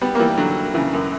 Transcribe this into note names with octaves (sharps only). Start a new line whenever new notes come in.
G3 B3
A#3
E3 G3
D3 F#3
C#3 E3
F#2